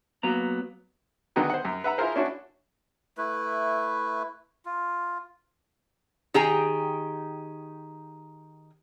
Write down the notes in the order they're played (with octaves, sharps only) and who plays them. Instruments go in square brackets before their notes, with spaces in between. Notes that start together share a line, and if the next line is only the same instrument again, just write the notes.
[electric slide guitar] F#3 A#3 B3 A#5
[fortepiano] D3 D#3 F#3 B3 D#4 G#4
C5 F#5
F#2
B4 E5 F#5 A#5
E4 F4 G#4 A#4 C5
C#4 D4 E4 F#4 C#5
[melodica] A3 E4 B4
F4
[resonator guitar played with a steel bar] D#3 G4 G#4 G5 G#5 A#5